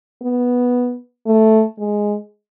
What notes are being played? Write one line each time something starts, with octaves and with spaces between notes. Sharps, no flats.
B3
A3
G#3